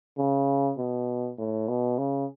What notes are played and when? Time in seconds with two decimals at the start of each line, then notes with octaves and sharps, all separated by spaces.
0.18 C#3
0.78 B2
1.38 A2
1.68 B2
1.98 C#3